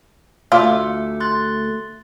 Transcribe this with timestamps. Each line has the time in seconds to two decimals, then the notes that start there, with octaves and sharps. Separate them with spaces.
0.52 D2 A3 F4 E5 D6 E6
1.20 C6 F#6 A6